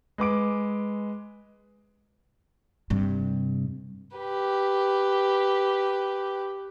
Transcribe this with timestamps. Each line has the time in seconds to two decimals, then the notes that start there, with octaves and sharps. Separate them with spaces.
0.18 G#3 B4 D6 D7
2.90 G2 C3
4.17 G4 B4